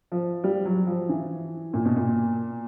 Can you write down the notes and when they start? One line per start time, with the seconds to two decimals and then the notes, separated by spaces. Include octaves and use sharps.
0.12 F3
0.44 G3
0.65 F#3
0.87 F3
1.09 E3
1.73 A#2
1.85 B2
1.96 A#2